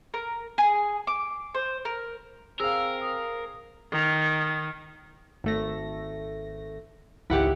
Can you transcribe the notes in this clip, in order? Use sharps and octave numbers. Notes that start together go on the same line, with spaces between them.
A#4
G#4
D6
C5
A#4
C4 G#4 A#4 F5 E6
D#6
D#3
G#1 A3 A#6
G#1 C#2 E4 G4 F#5